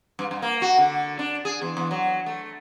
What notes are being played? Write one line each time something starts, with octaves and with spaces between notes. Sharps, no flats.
G2
G2
A#3
F#4
D3
D4
G#4
E2
E2
F#3
A3